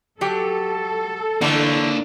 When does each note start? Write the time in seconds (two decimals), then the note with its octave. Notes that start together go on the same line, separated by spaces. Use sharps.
0.21 F#3 G4 A4
1.41 D3 E3 A3 A#3 C#5